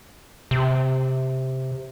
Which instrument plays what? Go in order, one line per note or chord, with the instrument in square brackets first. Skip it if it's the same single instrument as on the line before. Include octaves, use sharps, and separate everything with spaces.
[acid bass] C3